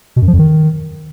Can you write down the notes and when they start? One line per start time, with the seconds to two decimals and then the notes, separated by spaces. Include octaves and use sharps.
0.16 B2
0.22 F#2
0.28 F3
0.33 F2
0.39 D#3